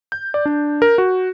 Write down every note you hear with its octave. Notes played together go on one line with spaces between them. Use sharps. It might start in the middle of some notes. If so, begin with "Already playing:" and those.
G6
D5
D4
A#4
F#4